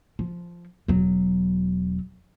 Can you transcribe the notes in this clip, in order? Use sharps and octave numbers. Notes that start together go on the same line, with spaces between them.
F3
E1 F#3